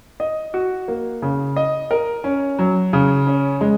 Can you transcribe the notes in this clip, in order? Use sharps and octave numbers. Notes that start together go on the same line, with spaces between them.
D#5
F#4
A#3
C#3
D#5
A#4
C#4
F#3
C#3
C#4
G#3